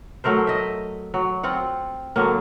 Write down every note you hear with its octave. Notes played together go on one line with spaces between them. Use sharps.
F#3 A3 A#4 C5
D#5 E5
F#3
C4 F4 F#5
D3 F#3 A#3